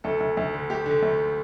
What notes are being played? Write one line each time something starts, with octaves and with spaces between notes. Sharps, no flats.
D2 A4
D2
D2
D3
A3 G4
D3
D2